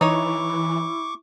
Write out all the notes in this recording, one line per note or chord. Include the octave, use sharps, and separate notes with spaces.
E3 D#4 E4 C#5 C#6 D6